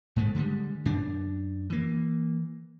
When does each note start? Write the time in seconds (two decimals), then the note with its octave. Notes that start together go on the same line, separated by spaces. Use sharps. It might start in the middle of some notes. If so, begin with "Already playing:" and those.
0.16 G#2 G#3 A3
0.35 D3 F3 G3 G#3
0.85 F#2 D4
1.70 E3 A#3